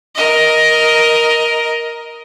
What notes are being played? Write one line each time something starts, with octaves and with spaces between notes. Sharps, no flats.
A#4 D#5